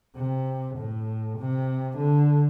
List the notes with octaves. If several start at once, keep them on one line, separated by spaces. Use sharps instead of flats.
C3
A2
C3
D3